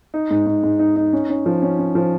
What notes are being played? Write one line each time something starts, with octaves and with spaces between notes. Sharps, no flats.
D#4
G#2
G#2
G#2
D#4
D#4
C#4
C#4
F3
C#4
C#4
F3